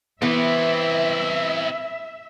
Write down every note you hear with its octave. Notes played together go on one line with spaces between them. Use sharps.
E3 B3 C4 E4 E5